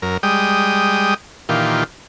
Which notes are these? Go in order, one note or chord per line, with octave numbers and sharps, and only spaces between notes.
F#2 A#4
G3 G#3 G5 D#6
A#2 D#3 E3 F4 G4